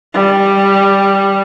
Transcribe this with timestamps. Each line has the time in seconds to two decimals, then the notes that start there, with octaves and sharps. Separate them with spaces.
0.14 G3